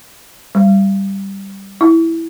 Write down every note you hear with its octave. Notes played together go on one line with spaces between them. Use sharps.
G3
E4